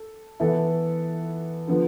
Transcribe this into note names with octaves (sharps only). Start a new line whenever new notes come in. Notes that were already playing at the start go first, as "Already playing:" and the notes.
Already playing: A4
E3 B3 E4 A4
D3 F3 B3